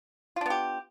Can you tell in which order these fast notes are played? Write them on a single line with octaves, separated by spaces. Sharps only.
F4 D4 B3 G4